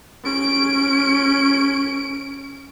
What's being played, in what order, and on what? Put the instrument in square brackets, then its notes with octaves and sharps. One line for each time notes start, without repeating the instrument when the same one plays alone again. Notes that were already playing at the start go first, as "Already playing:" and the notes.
[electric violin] C#4 D7